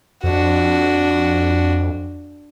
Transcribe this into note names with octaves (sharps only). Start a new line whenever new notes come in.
F2 D4 F#4